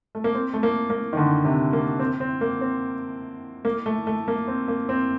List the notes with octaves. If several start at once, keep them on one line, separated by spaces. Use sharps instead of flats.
A3
A#3
C4
A3
A#3
A#3
D#3
D3
C3
A#3
C4
C4
A#3
C4
A#3
A3
A3
A#3
C4
A#3
C4